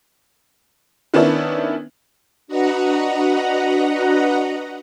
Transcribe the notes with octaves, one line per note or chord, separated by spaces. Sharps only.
D#3 B3 C#4 D4 E4
D4 F#4 B4 D#5 F#5 A#5